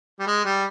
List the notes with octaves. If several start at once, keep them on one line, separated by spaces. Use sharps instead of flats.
G3
G#3
G3